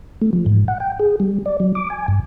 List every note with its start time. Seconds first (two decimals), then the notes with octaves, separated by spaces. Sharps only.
0.22 A3
0.33 F3
0.46 G#2
0.68 F#5
0.80 G5
1.00 G#4
1.20 G3
1.46 D5
1.60 F#3
1.75 D6
1.90 G#5
2.08 G2